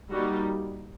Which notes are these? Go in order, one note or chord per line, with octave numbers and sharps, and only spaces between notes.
G3 A#3 D#4 F#4